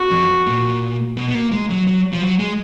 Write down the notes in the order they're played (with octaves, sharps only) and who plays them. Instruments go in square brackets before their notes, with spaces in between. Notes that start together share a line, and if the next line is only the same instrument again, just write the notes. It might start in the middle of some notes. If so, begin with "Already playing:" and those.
Already playing: [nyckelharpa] F#4
[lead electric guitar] F2
A#2
B2
B3
A#3
G#3
F#3
F#3
F3
F#3
G#3